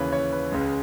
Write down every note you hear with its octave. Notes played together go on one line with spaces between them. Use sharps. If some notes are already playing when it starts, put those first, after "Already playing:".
Already playing: D#2 C#3 E3 B4 C#5
C#5
B4
C#2 C#3 G#3